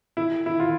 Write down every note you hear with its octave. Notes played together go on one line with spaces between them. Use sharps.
E4
E4
F4